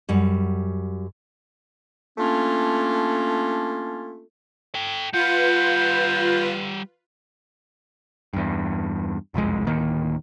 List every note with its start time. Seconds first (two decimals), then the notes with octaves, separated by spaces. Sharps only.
0.09 F#2 G3
2.18 A3 A#3 C#4 D4 F4
4.75 A4 G5
5.13 G3 F4 B4 F#5 G6
8.33 E2 G2
9.34 F#1 C2 F2 G#3
9.67 D1 D#3 A#3